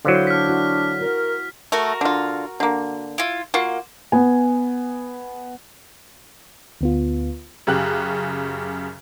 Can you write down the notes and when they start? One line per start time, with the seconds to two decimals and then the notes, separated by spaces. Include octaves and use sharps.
0.05 D3 F#3 E4 C5 F5
0.27 D4 F6 B6
0.47 E4 F#4
1.00 F#4 A#4
1.72 A3 F#4 A#4
2.01 D3 F4
2.60 D3 A#3
3.18 E4 F4
3.54 A#3 F4 F#4
4.12 B3 G#5
6.81 D2 B3 F4
7.67 F#2 C#3 G4 F#6